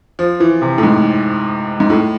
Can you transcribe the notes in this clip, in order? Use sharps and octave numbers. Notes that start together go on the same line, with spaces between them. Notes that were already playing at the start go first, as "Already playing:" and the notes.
F3
E3
C3
A2
G#2
G#2
A2